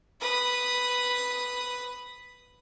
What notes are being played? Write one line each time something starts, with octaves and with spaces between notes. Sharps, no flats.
B4 D#6